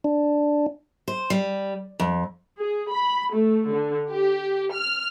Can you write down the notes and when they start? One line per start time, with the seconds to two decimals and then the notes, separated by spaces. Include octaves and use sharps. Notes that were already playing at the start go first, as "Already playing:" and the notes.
0.04 D4
1.08 C5
1.30 G3
2.00 F2
2.59 G#4
2.91 B5
3.34 A3
3.70 D3
4.11 G4
4.72 F6